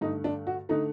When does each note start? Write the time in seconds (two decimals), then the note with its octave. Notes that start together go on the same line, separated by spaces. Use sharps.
0.01 G2 D3 A3 D#4
0.24 D4
0.47 F#4
0.69 D3 A3 D#4